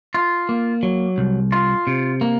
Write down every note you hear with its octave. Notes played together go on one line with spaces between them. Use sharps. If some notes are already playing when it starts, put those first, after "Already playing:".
F4
A#3
F#3
C2
F4
C3
A#3